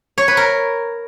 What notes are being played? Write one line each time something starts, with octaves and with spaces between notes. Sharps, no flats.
C#5
B4
A#4